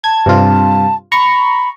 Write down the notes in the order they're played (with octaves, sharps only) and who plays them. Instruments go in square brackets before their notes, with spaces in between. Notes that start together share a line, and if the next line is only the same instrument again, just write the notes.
[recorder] A5 [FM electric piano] G#6
[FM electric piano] G2 C3 F4
[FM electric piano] A#5 C#6 [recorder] B5